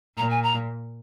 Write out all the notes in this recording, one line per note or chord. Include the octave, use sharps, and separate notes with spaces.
A#2 A#5
G#5
A#5